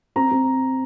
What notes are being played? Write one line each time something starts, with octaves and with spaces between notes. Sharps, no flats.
C4 A#5
C4